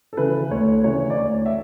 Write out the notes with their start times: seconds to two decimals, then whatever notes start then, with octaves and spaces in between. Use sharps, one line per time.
0.13 A4
0.17 C#3 E3 B4
0.50 D2 C#5
0.84 C#3 E3 C#5
1.10 D5
1.18 D2 C#5
1.46 E5